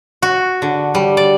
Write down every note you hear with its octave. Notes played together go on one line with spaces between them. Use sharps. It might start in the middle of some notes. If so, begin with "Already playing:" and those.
F#4
D3
G3
D5